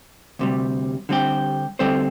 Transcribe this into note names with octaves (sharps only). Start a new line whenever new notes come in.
D2 C3 G3
D3 G3 C4 G4
D3 G3 C4 A4 C5